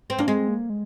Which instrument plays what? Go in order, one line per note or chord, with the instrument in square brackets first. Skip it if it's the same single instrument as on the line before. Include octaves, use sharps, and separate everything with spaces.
[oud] C4
[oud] A#3 [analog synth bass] D4
[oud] G#3 [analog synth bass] C4
[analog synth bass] A#3
G#3